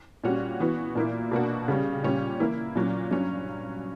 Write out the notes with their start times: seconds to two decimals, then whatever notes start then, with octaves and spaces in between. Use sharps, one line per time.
0.23 A#2 G3 C#4 F#4
0.60 E3 B3 F#4
0.95 A#2 A#3 E4
1.31 B2 A#3 D4 F#4
1.68 C#3 G3 C#4
2.03 A#2 G3 C#4
2.39 E3 A#3 E4
2.75 A#2 F#3 C#4
3.11 G2 F#3 C#4